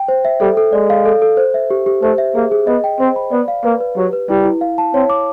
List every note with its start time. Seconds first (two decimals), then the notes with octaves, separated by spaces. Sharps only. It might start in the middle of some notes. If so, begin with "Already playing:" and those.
Already playing: G5
0.08 C5
0.25 E5
0.41 G3 A4
0.57 A4
0.73 G#3 D5
0.90 F5
1.05 A4
1.22 A4
1.37 C5
1.54 E5
1.70 G4
1.86 G4
2.02 A3 C5
2.18 E5
2.35 A#3 G#4
2.52 G#4
2.67 B3 D#5
2.84 G5
3.00 C4 C5
3.16 B5
3.31 B3 D5
3.48 F5
3.64 A#3 B4
3.80 B4
3.97 F#3 G4
4.13 B4
4.29 G3 E4
4.45 E4
4.61 F5
4.78 A5
4.94 C4 C#5
5.10 D6